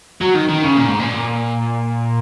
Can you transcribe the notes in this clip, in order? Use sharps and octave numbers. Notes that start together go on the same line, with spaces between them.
F#3
D#3
D#3
C#3
A#2
G#2
A#2